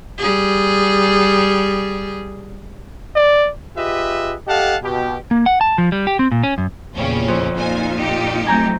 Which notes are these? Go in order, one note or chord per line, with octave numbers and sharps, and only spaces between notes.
G3 G#4
D5
F4 G4 G#4 B4 D#5 E5
G4 A4 D#5 F5 F#5 A5
B2 G4
A#3
F#5
A5
F3
G3
G4
C4
A#2
C#4
F#2
E2 A#2 C#3 G3 C#4
F2
A#2 D#4 F4 C5 G#5
D#4 G4
F#3 A3 C4 G#5 A#5 G6